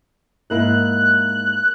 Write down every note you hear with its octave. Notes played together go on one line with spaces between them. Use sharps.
G#2 A#3 E4 F#6